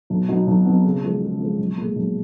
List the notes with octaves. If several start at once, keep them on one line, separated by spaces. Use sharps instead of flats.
B1
B2 F#3 B3 D#4
B1
B2 F#3 B3 D#4
C#3
F3 G#3
C#3
F3 G#3
B1
A#2 G#3
B1